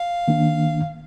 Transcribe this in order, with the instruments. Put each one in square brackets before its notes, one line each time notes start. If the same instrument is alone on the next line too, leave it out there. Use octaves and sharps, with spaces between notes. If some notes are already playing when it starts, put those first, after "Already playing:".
Already playing: [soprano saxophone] F5
[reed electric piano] D#3 A#3 D4